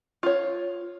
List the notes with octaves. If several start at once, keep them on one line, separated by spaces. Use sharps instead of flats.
F4 C#5